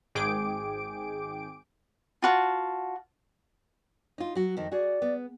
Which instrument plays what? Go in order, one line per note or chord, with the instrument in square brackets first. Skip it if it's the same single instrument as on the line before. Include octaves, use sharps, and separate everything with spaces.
[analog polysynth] G#1 G#2 G#4 G5 D6 D7
[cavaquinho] F4 F#4 A5
[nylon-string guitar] D#4 F4
F#3 F#4
[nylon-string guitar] F2 D#3 [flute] D#5
[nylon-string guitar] F#4 G#4 [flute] D5
[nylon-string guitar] B3